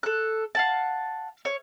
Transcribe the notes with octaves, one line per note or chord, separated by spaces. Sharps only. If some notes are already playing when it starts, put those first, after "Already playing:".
A4 F#6
F5 F#5 A5
C#5